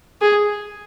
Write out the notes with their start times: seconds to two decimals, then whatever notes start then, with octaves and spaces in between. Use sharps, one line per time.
0.22 G#4